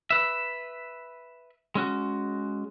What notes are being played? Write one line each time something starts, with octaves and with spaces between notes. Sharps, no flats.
B4 E5
G#3 C#4 F#4